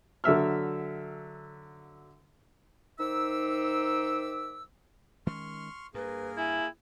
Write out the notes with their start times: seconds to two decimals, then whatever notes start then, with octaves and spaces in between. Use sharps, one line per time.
0.24 D3 F#3 E5 F6
2.99 D#3 D#4 C5 E5 D6 E6
5.27 D#3 G#3 C#4 C6 C#6 F6
5.94 G2 A#3 G#4 A#4 B4
6.37 E4 G#5